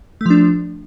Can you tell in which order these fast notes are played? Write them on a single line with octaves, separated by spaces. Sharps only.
A3 F3 D4